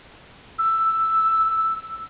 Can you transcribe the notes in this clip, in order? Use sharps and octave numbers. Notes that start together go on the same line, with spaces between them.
E6